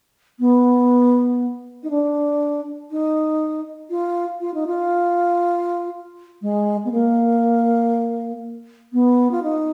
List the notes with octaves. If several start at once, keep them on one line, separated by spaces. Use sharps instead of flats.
B3
D#4
D4
D#4
F4
F4
D#4
F4
G#3
B3
A#3
B3
F4
D#4